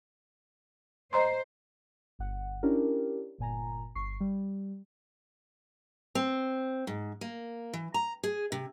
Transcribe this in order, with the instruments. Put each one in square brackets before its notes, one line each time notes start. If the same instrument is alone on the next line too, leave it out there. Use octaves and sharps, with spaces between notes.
[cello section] C5 [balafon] D#5 A#5 C6
[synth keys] G1 F#5
C#4 D4 E4 G4 A#4
G1 A#2 G#5 A#5
G1 C#6 C7
G3
[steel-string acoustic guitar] C4
G#2
A#3
E3
A#5
G#4
C3